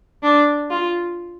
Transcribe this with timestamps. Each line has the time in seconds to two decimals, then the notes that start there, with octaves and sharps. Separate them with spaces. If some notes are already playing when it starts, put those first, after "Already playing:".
0.23 D4
0.70 F4